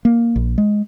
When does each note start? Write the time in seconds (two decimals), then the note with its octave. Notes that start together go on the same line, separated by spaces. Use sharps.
0.05 A#3
0.36 A#1
0.58 G#3